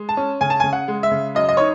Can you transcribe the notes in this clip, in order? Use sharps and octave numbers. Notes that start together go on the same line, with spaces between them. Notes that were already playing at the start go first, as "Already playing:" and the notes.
Already playing: G#3
A5
C#4
C#3 G#5
A5
C#3 G#5
F#5
G#3
E5
C#3
F#2 D#5
D#5
D#4 C#5